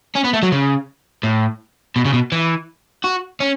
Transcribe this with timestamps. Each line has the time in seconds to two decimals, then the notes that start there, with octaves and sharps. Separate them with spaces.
0.16 C#4
0.25 B3
0.33 A3
0.43 F#3
0.52 C#3
1.23 A2
1.96 B2
2.05 C#3
2.13 B2
2.32 E3
3.04 F#4
3.40 C#4